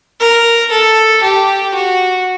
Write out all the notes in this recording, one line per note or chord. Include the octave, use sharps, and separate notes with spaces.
A#4
A4
G4
F#4